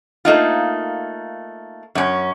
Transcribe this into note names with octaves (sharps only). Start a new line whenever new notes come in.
A3 A#3 D#4 F4
F#2 C#4